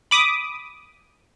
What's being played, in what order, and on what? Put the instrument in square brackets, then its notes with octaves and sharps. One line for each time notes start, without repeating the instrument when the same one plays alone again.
[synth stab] B5 D6 D#6